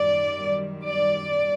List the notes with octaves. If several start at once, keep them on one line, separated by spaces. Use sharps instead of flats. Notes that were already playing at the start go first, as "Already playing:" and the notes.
Already playing: F#2 D#3 G3 D5
D5